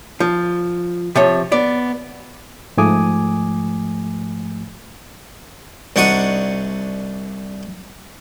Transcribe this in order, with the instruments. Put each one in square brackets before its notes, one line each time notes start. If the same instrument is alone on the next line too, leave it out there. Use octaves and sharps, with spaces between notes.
[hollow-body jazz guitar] F3
C3 F3 C#5
B3 D5
[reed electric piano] G#2 F3 A3 G#5 D6 D#6
[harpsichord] C2 D4 D#4 F#5 C#6 D#6